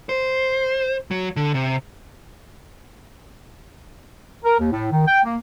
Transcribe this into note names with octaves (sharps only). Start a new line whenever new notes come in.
C5
F#3
D3
C3
A#4
D#2
A2
D#3
G5
A#3